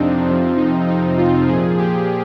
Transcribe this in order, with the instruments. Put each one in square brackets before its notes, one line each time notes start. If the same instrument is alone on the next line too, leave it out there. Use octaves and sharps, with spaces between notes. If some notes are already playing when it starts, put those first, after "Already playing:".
Already playing: [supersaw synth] F2 C3 F3 C4 D4 D#4
F2 C3 F3
D#4
D#4
F4
A#2 F3 G#4
G4